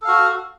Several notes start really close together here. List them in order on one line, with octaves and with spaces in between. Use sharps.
A4 F5 F#4